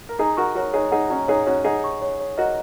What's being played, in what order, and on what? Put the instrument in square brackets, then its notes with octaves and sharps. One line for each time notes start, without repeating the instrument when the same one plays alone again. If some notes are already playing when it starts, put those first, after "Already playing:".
[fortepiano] A#4
[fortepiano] D#4 G#4 [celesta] A#5
[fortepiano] F#4 A#4 [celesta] C#6
[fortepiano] F#4 A#4 [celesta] C#5
[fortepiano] D#4 G#4 [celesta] C#5
[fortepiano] D#4 G#4 [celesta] F#5
[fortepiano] C#4 F#4 [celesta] A#5
[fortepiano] D#4 G#4 [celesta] C#5
[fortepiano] C#4 F#4 [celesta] C#5
[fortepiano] D#4 G#4 [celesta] F#5
[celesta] C#6
C#5
C#5
[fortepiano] F#4 A#4 [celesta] D#5